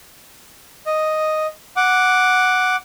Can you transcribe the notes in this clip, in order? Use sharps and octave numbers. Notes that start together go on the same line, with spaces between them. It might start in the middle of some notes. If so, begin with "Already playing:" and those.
D#5
F#5 D6